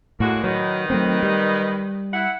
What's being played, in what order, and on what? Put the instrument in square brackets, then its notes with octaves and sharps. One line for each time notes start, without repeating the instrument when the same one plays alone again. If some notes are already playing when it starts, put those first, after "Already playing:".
[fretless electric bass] A2 [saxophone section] G#3 A#3 F#4
[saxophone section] D#3 B4 [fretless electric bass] F#3
[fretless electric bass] F#3 A3 C4
G3
[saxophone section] E4 F#5